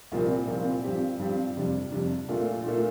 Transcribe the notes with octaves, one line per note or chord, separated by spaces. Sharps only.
C2 A#2 F3 C4
C2 A#2 F3 C4
G2 F3 C4 G4
G2 F3 C4 G4
F2 C3 G3 D4
F2 C3 G3 D4
A#2 A3 D4 F4
A#2 A3 D4 F4